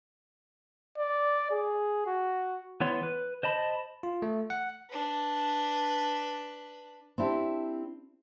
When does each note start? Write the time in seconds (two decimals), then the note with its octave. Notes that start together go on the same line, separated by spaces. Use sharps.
0.98 D5
1.51 G#4
2.07 F#4
2.80 E3 B3 C#5 C6
3.03 B4
3.43 C5 D#5 A5 B5
4.03 F4
4.22 A3
4.50 F#5
4.90 D4 B4
7.18 C4 D4 E4 G4